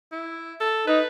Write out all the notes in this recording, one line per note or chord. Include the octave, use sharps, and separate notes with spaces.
E4
A4
D#4 B4